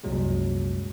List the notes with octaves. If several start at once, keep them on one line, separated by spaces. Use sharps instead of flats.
C2 F#2 A#2 F#3 G#3